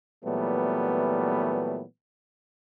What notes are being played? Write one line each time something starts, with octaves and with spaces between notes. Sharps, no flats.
A#2 E3 F#3 G3 A3 B3